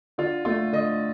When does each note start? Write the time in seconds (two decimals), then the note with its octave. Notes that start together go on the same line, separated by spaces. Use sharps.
0.18 D3 F4
0.45 A3 F4
0.72 D3 D#5